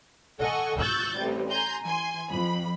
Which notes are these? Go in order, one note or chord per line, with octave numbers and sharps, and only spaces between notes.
A4 D#5 F#5 G#5 C#6
C#6 E6 F#6 G6 A6
A1 C3 G3
G#5 A#5 C6 G6
E3 G#5 C6
F2 B5